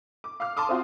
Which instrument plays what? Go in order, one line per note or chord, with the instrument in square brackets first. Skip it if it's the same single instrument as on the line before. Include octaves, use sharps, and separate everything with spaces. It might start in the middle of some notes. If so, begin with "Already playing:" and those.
[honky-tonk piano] D6
F5 D6 F6
A5 C6 D6 D#6
C4 F4 F#4